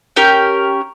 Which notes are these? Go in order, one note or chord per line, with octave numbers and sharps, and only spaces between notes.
C#4 G4 A#4